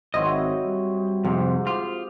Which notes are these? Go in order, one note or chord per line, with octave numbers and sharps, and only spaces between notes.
G#1 F#3 C4 E4 D#5
G3
F2 G#2 C3
F4 G4